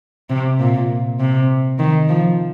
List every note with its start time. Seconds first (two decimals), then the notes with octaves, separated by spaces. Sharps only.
0.30 C3
0.60 A#2
1.20 C3
1.79 D#3
2.09 F3